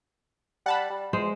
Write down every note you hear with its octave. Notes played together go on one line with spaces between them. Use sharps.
G3 F#5 A5 B5
G3
E2 G#3 C5